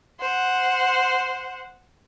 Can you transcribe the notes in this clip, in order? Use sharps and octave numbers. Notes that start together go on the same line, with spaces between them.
C5 F#5